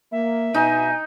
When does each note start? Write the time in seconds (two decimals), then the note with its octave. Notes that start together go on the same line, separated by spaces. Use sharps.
0.12 A#3 E5
0.54 B2 D#4 G#5